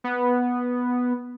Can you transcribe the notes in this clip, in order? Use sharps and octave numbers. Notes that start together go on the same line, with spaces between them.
B3